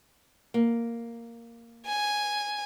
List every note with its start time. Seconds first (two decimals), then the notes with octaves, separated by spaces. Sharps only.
0.54 A#3
1.86 G#5